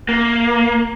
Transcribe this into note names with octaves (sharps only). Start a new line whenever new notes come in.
A#3